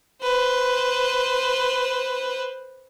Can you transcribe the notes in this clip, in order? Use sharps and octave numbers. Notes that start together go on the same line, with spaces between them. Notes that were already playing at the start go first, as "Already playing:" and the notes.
B4 C5